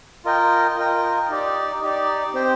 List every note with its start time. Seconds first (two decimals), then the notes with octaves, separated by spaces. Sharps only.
0.25 F4 A#4 D#5 G5
0.77 F4 A#4 D#5 G5
1.29 D#4 G4 D5
1.82 D#4 G4 D5
2.34 C4 G4 C5 G5